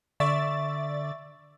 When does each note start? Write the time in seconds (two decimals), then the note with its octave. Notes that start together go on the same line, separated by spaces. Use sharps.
0.20 D3 D5 E5 C#6 A6